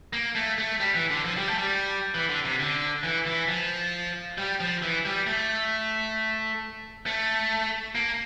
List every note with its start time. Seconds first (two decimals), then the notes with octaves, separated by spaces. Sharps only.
0.13 A#3
0.35 A3
0.58 A3
0.80 G3
0.95 E3
1.10 D3
1.25 F3
1.37 G3
1.48 A3
1.58 G3
2.15 E3
2.29 D3
2.45 C3
2.60 D3
3.03 E3
3.26 E3
3.48 F3
4.38 G3
4.60 F3
4.82 E3
5.05 G3
5.27 A3
7.06 A3
7.95 A#3